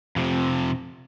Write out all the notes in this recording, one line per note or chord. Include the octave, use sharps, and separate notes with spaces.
F2 C3